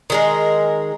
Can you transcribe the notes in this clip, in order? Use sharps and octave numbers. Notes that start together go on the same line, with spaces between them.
D#3 G#3 A#4